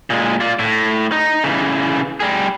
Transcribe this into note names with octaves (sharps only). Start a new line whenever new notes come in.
A#2 G#3
F4 D5
A2
D#4
C#3 E3
G3 G#4